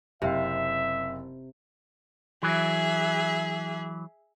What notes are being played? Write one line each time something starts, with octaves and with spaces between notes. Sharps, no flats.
F#1 C3 C4 E5 F5
E3 F#3 G#4 E5